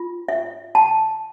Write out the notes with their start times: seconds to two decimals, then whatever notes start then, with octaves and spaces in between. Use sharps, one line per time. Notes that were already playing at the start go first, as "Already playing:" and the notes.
Already playing: F4
0.28 E5
0.75 A5